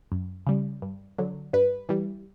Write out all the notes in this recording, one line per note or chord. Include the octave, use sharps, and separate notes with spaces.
F#2
C#3 G3
G2
D3 F#3
G2 B4
E3 G3